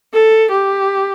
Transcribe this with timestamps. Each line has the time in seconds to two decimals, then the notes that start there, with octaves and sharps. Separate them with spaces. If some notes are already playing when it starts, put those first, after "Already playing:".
0.14 A4
0.51 G4